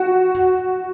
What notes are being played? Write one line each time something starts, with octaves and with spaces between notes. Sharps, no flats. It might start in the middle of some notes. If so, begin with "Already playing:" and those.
Already playing: F#4